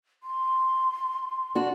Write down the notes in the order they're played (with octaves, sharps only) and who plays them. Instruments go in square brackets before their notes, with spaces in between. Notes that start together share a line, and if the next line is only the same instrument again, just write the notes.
[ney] C6
[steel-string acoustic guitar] D4 F#4